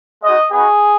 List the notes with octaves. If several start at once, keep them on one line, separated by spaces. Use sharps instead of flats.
G#3 D#4 F#4 D#5
B3 D#4 F#4 G#4